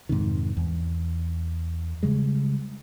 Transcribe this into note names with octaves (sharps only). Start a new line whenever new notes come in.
F2 G#2 C3 D#3
E2
C#3 G3 G#3